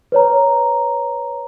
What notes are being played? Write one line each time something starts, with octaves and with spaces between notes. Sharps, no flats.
B4 C#5 A#5